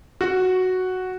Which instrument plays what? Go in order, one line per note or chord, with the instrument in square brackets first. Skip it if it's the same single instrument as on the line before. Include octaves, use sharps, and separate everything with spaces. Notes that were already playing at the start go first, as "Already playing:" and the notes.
[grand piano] F#4